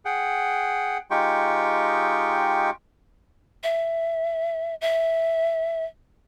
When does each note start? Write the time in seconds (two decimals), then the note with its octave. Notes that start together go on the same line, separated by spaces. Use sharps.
0.05 G#4 F#5 G5
1.11 G#3 D#4 F4 G4 G5 C#6
3.64 E5
4.81 E5